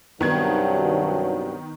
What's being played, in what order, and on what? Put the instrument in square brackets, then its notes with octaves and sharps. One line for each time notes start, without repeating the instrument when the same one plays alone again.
[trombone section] C2 G2 F#3 [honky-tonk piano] D#3 B3 G#6